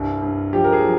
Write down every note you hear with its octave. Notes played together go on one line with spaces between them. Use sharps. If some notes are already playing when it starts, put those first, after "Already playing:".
Already playing: C2 G2
G2
F3 G4
A#4
G#4
F3